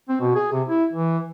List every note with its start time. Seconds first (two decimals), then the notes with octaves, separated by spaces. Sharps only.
0.09 C4
0.21 B2
0.35 G#4
0.52 C3
0.68 E4
0.93 E3